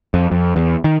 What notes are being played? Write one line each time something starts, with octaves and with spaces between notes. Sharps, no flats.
F2
F2
E2
D#3